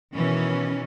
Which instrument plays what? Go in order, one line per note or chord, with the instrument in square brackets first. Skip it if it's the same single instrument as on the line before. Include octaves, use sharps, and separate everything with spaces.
[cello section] B2 D#3 E3 C#4